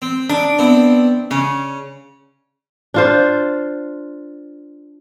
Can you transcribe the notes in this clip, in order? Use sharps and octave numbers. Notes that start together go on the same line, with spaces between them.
C4
D4 D5
B3 C4 E4
C#3 C#4
D4 F4 C5